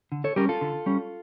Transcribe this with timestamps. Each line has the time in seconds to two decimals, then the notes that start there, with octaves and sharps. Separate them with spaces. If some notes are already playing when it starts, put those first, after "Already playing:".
0.12 D3
0.24 A4 C#5
0.36 G3 C#4 G4 A#4
0.49 F4 A4
0.61 D3
0.86 G3 C#4